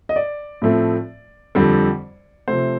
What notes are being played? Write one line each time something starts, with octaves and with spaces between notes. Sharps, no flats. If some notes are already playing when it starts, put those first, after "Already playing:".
D#5
D5
A2 F3 A3 C4
F2 D3 G3 C4
C3 F3 A3 C4 C5